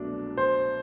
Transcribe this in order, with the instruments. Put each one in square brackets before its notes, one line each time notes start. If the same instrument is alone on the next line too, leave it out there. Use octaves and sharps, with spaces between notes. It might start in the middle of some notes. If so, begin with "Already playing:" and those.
Already playing: [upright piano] C2 B2 F#3 A3 D4
[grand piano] C5